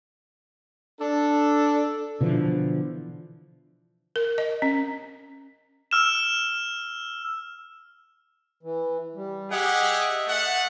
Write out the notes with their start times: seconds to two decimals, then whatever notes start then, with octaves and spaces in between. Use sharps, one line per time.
1.00 D4 A4
2.20 B2 D3 E3 F3
4.16 A#4
4.38 D#5
4.62 C#4
5.91 E6 F6 E7
8.63 E3
9.15 G3
9.51 G4 G#4 D#5 E5 F#5
10.27 A3 F#5